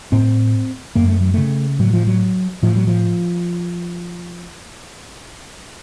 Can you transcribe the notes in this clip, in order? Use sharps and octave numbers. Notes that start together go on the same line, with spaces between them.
A2 C4
F#2 A#3
A3
F#3
C#3 A3
A2 F#3
F3
F#3
A2 F3
F#3
F3